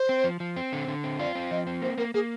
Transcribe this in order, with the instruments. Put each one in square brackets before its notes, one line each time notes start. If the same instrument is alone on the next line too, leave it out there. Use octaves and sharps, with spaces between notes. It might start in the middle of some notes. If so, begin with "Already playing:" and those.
Already playing: [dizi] C5
[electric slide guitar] C4
F3
F3
C4
D3
D3
C4
[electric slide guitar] F4 [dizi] D5
[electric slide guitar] C4
[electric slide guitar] F3 [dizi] D#5
[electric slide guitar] C4
[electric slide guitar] A#3 [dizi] C5
[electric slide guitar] A#3 [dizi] A#4
[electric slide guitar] A#3 [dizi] G#4